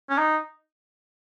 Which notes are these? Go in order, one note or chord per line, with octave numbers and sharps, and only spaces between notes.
C#4
D#4